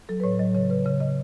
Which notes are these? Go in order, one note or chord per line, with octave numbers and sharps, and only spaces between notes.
F#3 A4
B4
A2 C#5
F#3 D#5
C#3 C#5
C#3 B4
C#3 C#5
C#3 D#5